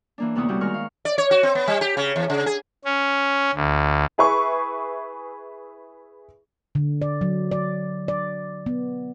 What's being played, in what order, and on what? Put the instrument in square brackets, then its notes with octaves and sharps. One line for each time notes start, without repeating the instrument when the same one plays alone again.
[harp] E3 A#3 D4
D2 C3 B3 E4 C#6 D#6
G3 B3 C4 E4 F#4 G4
D#3 G#3 A#4 C#6 F6
F5
[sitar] D5
C#5
F#4
C4
B3
G3
G4
C#3
E2
C#3
G#4
[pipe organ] C#4
D2
[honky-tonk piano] E4 G#4 B4 E5 C#6
[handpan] D3
D5
F#3
D5
D5
B3